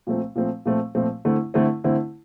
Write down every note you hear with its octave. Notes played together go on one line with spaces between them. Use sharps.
A#2 F3 A3 C4
A#2 F3 A3 C4
A#2 F3 A3 C4
A#2 F3 A3 C4
D3 A3 C4 E4
D3 A3 C4 E4
D3 A3 C4 E4